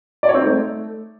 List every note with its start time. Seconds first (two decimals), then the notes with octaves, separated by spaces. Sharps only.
0.23 D5
0.29 C#5
0.34 C4
0.40 D#4
0.46 A3